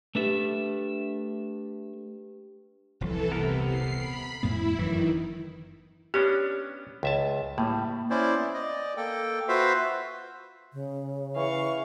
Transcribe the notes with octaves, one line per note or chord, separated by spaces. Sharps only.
A3 D4 G4 B4 E5
D#1 C2 E3 F3 A4
C3 B3 A#4
C7
B5
F2 A2 B3 E4
G1 F#2 D#3 E3 F#3
B3 C#4 D4 G4
C#2 E5 A5
A2 G3 A#3
C#4 E4 C5 D5
B3
D5 D#5
A#3 A4 G5
F4 F#4 B4 C5 E5 F5
C#3
E3 F5 C#6